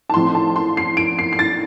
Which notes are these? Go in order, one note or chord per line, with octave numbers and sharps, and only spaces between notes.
A5
A1 A2 F3 C4 C6
A5
C6
C7
D7
C7
C7
A6